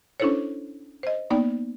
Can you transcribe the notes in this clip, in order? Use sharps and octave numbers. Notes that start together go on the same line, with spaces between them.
C#4 D4 E4 A4 C5 C#5
C5 D#5
A#3 B3 D#4 D5 G5